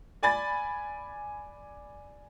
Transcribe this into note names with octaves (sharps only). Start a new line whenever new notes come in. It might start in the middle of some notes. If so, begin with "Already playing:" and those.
D5 G#5 B5 A6